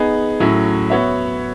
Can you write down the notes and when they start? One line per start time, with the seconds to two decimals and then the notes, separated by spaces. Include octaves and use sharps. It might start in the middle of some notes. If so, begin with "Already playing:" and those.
Already playing: B3 D#4 G#4
0.40 A2 F#3 C#4 E4
0.90 B3 F#4 C#5 E5